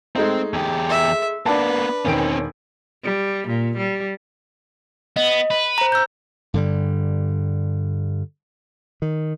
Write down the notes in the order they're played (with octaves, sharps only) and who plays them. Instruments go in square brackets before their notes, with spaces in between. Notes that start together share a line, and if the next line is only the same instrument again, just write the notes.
[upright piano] G#3 A3 D#4 [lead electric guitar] C4
[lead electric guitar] E2 G4
[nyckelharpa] E5
[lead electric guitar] A#3 B3 [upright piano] D4 A5 [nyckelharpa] B4
[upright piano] E1 D#3 D7 [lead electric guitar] C4 C#4
[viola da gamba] G3
A#2
G3
[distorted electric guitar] B3 [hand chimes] D#5
[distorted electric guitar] B4
[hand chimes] C5 A#5
E6 G6
[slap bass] G2 D3 G3
D#3